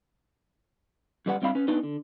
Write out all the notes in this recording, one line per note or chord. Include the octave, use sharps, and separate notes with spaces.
F#2 G3 B4 F#5
G2 C4 E4 F5 B5
C#4 B4
B3 D4 D#4 B4
D3